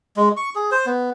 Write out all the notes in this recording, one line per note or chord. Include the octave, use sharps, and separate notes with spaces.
G#3
C#6
G#4
C5
B3